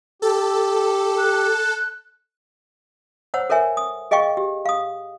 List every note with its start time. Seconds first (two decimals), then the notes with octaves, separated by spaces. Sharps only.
0.22 G4 A4
1.18 F#6
3.34 C5 C#5 F#5 E6
3.50 A4 A#4 C#5 E5 G#5
3.77 D#6
4.11 G#4 D#5 F5 G5 C#6
4.37 G4
4.66 F5 D#6